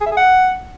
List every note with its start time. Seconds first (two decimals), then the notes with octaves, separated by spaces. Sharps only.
0.01 G#4
0.06 E5
0.12 G#4
0.17 F#5